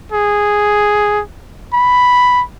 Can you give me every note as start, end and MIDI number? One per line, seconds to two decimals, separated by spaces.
0.12 1.21 68
1.74 2.42 83